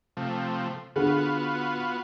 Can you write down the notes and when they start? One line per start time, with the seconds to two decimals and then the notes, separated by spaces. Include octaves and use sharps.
0.17 C3 F3 A3
0.96 D3 B3 F4 F#4 G#4